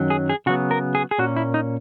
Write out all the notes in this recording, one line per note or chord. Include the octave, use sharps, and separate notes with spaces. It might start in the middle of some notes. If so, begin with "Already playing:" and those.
Already playing: F#2 D#3 F#3 C#4
G#4
G#4
C#3 F#3 B3 F#4
A#4
G#4
G#4
A#2 A#3 C#4 F#4
E4
D#4